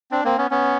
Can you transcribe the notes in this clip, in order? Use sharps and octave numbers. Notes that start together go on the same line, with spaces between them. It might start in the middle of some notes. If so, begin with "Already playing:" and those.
C4 D4
A#3 C4
B3 C#4
B3 C#4